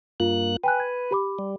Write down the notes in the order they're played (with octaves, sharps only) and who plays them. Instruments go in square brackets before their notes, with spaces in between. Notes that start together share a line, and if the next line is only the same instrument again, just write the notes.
[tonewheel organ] G2 A#3 F#6 [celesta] F4
[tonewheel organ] B4 [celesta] G5 G#5 F#6
[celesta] G#6
G4 B5 D6
[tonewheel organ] G3